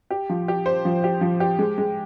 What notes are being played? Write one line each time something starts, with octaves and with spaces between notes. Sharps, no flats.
G4
F3
G4
C5
F3
G4
F3
G4
G#3
G#3